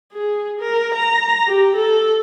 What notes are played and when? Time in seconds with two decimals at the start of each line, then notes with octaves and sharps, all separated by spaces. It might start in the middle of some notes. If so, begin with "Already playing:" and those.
0.13 G#4
0.61 A#4
0.95 A#5
1.47 G4
1.76 A4